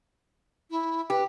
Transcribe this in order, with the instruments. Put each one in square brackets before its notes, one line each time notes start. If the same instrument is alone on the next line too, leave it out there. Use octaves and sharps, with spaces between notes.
[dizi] E4
[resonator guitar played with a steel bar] G4 [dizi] B4